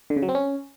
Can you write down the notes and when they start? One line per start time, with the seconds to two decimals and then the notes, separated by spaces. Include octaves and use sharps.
0.10 D3
0.16 C#3
0.22 F#3
0.29 C4
0.35 C#4